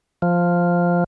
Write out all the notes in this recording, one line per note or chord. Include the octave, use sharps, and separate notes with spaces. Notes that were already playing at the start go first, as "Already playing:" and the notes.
F3